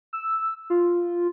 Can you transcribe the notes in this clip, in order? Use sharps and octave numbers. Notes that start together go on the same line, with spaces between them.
E6
F4